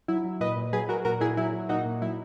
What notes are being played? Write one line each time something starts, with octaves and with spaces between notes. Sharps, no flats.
F#3 E4
F#3
A#2 B4 D#5
A#2
F#3 G#4 B4
F#3 F#4 A#4
A#2 F#4 A#4
A#2 E4 G#4
F#3 E4
F#3
A#2 D#4 F#4
A#2
F#3 E4